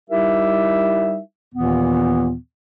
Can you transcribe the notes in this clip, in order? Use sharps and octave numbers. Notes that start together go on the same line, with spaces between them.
G3 D#4 E4 G4 A#4 E5
D#2 A#2 D#3 E3 B3